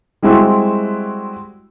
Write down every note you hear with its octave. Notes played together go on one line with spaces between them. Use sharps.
G3 G#3 C4 E4 F#4